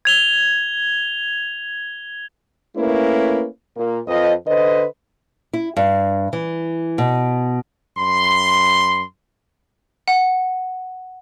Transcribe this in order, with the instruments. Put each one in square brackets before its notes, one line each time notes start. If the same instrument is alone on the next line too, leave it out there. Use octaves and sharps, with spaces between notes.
[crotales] G#6 F7 G7
[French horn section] A3 A#3 C#4 E4 B4
A#2 A#3
F2 F3 B4 D#5
D3 B4 C5 D#5
[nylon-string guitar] E4
G2
E3
B2
[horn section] F#2 B5 C6
[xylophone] F#5